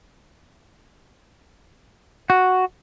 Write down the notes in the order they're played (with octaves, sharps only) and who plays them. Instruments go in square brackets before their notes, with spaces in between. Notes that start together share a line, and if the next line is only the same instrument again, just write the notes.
[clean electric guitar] F#4